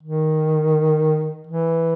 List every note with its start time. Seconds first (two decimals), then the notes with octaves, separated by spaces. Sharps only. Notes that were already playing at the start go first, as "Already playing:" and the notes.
0.03 D#3
1.47 E3